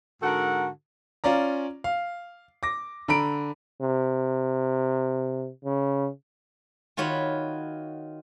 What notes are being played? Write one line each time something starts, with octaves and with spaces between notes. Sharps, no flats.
G#2 D3 F#4 A4 A#4 F#5
C#4 F4 D5 A#5
F5
D6 A#6
D3 A#5 B5 D7
C3
C#3
D#3 F4 F#4 C#5 E5 B5